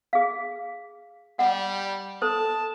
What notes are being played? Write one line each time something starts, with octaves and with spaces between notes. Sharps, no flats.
G#4 F5
G3 F#5
A4 C5 A5